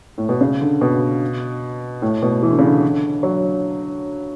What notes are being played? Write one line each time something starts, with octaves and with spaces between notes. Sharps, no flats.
A2
B2
C#3
D3
B2
A2
B2
E3
D3
C#3
D3
F#3